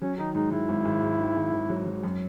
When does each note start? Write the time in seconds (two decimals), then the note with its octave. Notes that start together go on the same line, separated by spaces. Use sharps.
0.02 F#3 C#4
0.18 D#3 D#4
0.35 G#2 D#4
0.51 G#2 E4
0.69 G#1
0.85 G#1
1.02 G#2
1.20 D#3
1.36 G#1
1.53 G#1
1.69 F#3
1.86 F#3
2.03 F#2